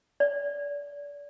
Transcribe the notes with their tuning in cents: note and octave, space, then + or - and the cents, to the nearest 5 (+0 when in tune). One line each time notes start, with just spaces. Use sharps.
D5 -30